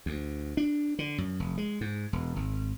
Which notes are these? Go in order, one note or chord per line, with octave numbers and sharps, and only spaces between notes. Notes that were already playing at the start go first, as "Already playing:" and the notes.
D2
D4
D3
F#2
F1
G#3
G#2
E1
G#1